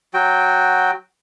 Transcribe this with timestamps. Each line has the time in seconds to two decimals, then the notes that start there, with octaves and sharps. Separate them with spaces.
0.14 F#3 F#4 G5